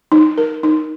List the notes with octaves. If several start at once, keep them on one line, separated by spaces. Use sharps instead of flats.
D#4
A#4
D#4